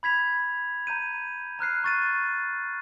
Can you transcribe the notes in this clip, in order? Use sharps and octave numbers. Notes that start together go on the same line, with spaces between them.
B5 G#6 B6 F7
A#5 G6 D#7
A#5 F6 F#6 C7
C#6 A6 D#7